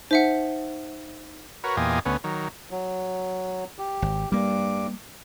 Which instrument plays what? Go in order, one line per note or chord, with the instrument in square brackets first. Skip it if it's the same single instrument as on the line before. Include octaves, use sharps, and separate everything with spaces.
[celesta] D#4 [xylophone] C5 E5 F#5
[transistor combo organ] F#4 A#4 B4 C#5
E2 A#2 F4 G4 D#5 G#5
D2 B3 C#4
D#3 F#3
[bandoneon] F#3
G4
[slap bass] G#1
[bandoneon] G2 D6 [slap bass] G3 A#3